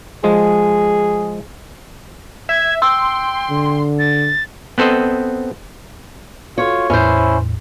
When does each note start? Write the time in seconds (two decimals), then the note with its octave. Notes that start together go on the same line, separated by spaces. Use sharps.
0.24 F3 G#3 G#4
2.49 E5 G#6
2.82 G5 C6 E6
3.50 D3
3.99 A6
4.78 B3 C4 A4 C5 D#5
6.58 F4 F#4 A4 C#5
6.90 E2 A2 C#4 E4 C5